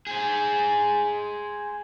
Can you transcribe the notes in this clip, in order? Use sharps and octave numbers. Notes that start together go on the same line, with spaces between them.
G#4 C5